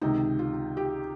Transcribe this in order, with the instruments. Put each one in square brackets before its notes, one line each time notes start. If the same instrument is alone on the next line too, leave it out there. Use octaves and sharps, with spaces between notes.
[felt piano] C#2 C3 D#3 D#4
F4
G4